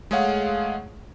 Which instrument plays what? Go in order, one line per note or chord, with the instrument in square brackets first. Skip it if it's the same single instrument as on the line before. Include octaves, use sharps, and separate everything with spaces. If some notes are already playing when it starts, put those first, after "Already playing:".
[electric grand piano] G#3 A3 G#4 C#5 F5 F#5